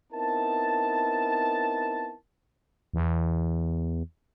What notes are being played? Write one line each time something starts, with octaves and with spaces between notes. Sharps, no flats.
B3 C4 D#4 E4 A#4 A5
E2